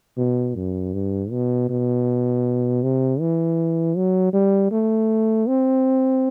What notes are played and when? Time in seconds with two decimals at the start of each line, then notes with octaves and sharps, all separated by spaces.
0.18 B2
0.56 F#2
0.94 G2
1.31 B2
1.70 B2
2.83 C3
3.20 E3
3.96 F#3
4.33 G3
4.71 A3
5.47 C4